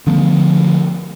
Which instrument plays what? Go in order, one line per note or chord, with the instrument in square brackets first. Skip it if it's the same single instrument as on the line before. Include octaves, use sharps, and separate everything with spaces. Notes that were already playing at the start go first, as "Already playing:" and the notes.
[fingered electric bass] D3 F3 A3 B3